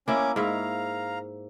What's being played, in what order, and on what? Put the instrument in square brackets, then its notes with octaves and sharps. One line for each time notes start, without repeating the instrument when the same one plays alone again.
[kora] A#3 E4 [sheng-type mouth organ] C#4 G#5 D6
[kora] G#2 E4 [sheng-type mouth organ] F5 A#5